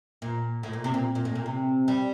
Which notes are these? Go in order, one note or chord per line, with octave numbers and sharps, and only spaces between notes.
A#2
A2
A#2
C3
A#2
A#2
A2
A#2
C3
G3